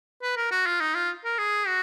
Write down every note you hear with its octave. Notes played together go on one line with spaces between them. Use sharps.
B4
A#4
F#4
F4
D#4
F4
A#4
G#4
F#4